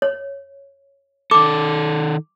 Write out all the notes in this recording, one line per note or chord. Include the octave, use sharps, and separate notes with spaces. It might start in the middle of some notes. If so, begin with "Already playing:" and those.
C#5
D#3 A4 D6